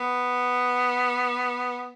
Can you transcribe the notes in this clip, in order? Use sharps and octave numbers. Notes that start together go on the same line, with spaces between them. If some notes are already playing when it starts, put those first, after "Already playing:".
Already playing: B3